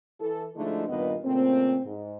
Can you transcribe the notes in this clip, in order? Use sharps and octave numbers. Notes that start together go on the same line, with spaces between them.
E3 A4
D3 F3 G#3 A3 D#4 E4
G2 A#2 D#3 B3 B4 D#5
A#2 C#3 A3 C4
G#2